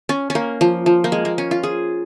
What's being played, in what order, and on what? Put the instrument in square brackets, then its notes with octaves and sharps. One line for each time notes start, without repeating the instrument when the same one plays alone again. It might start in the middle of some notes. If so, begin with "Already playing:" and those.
[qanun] C#4
C#4
A#3
F3
F3
A#3
G#3
A#3
C#4
F4
G#4